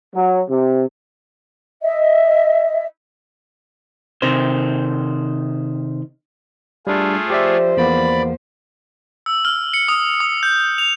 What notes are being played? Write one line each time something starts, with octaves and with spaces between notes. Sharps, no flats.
F#3
C3
D#5 E5
C3 D#3 C5
G3 A3 D4 F4 G#4
F3 G4 C5 D5 E5
E2 A#3 B3 D5 B5
E6
F6
C#7
D#6
D#6
G6
F7